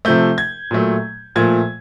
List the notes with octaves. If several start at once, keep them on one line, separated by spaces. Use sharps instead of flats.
C3 F3 A3 G6
G#6
A#2 F#3 A3
A#2 F3 A3 G#6